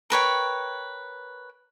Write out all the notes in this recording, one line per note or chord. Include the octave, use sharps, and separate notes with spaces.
A#4 B4 C#5 G5